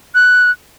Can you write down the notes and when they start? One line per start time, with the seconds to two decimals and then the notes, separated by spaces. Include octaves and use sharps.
0.15 F#6